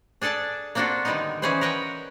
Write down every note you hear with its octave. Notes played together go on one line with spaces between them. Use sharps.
D4 G#4 A4 D5 A5
A#3 C4 D4 F4 F#4 A4
D3 D#3 G3 G#3 B3 D#4
E3 G3 C#4 G#4 B4 C5
A#4 B4 D#5 F#5 G5